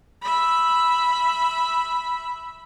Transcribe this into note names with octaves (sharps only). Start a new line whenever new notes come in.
E5 B5